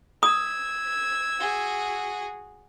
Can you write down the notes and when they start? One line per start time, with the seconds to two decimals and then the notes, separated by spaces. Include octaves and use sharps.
0.23 D#6 E6 G#6
1.39 F#4 G#4